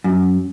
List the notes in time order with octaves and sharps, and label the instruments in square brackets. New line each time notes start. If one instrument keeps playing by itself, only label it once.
[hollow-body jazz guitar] F#2